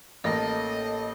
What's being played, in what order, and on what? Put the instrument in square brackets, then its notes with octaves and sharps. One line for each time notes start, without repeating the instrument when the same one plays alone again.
[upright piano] A1 A#3 A#6 [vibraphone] A4 A5 [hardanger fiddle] D#5